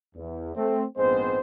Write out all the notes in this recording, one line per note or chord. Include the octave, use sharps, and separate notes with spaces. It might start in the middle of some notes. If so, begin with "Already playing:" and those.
E2
A3 C4
A#1 G#2 G#3 B3 C4 C5